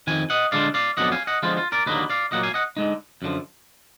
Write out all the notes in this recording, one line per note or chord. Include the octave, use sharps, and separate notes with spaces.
F2 D#3 G#5
D#5 F#5
D3 G#3 D4 F4 D5 F5
D5 F5
F2 D3 F#3 B3 D4 D#5 F#5
F5 G#5
D#5 F#5
D3 F3 G#3 B3 F4
F4
A#4 D5
D#2 D3 F#3 A#3 B4 D#5
D5 F5
A#2 F#3 A#3 D#5 F#5
F5 G#5
D#5 F#5
D3 G#3 D#4
F#2 D3 F3